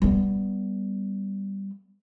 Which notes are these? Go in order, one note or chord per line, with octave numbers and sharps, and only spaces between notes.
G3 B3